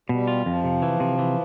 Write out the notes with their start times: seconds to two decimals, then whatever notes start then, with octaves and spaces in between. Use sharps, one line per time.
0.09 B2 G3
0.27 F4
0.46 F2 F3
0.64 C3
0.82 E3
1.00 C3
1.19 E3